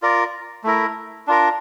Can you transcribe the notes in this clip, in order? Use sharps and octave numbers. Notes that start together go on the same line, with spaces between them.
F4 A#4 D5
A3 E4 A#4
D4 F4 A#4